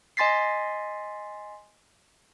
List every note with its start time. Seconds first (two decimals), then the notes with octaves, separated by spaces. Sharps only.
0.17 D#5 G#5 C6 A6 B6 C7